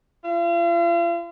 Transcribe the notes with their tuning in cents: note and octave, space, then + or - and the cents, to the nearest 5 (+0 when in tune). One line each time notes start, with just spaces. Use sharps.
F4 -40